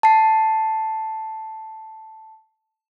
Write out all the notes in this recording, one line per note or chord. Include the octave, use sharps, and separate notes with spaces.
A5 C7